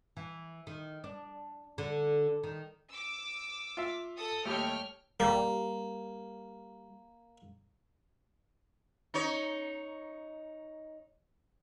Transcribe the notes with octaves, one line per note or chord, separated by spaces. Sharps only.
E3
D#3
D4
D3
D#3
D6 E6
F4 E5 F5
A4 D#6
D#2 G3 A3 C#5 G5 F6
G3 A#3
D#4 C#5